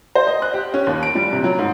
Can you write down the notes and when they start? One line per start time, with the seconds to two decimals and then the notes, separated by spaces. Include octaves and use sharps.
0.15 C5
0.27 D#5
0.42 F#6
0.54 G4
0.74 C#4
0.87 D#2
1.03 D7
1.15 G3
1.33 C3
1.44 F#3
1.59 G#2